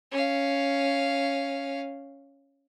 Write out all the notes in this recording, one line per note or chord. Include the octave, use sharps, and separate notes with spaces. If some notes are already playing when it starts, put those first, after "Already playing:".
C#4 F5